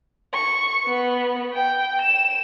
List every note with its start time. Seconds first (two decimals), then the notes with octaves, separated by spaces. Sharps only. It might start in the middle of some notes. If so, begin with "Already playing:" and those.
0.34 C#6
0.86 B3
1.54 G5
2.02 E7